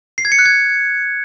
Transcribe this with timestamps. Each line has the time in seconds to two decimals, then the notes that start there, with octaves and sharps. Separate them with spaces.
0.18 C7
0.25 G#6
0.32 C#7
0.39 F#6
0.46 G#6